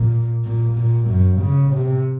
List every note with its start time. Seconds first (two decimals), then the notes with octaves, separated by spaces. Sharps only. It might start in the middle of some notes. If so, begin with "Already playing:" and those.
Already playing: A#2
0.45 A#2
0.78 A#2
1.09 F#2
1.41 C#3
1.74 C3